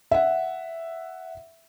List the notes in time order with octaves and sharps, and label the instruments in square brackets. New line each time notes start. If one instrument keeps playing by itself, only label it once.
[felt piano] E5 F#5